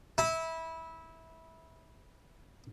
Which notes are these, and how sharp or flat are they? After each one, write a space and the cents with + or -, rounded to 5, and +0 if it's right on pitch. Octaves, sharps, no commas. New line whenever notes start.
E4 -20